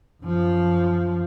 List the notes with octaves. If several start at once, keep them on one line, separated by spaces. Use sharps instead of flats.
F#2 F3